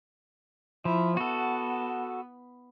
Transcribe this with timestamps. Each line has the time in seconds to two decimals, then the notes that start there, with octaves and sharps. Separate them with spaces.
0.85 F3 E4
1.17 B3 F#4 A4